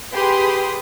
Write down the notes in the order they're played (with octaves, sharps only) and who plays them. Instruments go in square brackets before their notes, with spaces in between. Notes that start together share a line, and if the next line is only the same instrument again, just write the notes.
[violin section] G4 G#4 B4 B5 C6 D#6